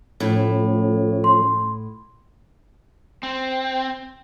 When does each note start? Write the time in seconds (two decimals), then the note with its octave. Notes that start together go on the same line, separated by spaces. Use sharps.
0.20 A2 F3 A3 C#4
1.24 C6
3.23 C4